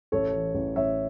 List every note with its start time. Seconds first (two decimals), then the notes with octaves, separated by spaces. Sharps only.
0.12 A1 A4 C#5
0.33 E3
0.54 A1
0.76 A1 C#5 E5